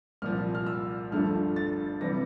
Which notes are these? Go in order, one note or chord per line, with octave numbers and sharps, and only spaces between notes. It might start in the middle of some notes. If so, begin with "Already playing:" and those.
C2 A#2 F3 F6
F6
E6
G1 G2 D3 F3 A3 F6
A6
C3 E3 G3 A#6